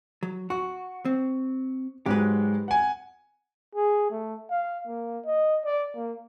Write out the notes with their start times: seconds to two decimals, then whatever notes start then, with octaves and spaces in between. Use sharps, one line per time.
0.23 F#3
0.50 F#4 C#6
1.05 C4
2.06 G#2 F#3 G#3 G4 B4
2.68 F#5 G#5
3.75 G#4
4.11 A3
4.50 F5
4.87 A#3
5.25 D#5
5.65 D5
5.96 A#3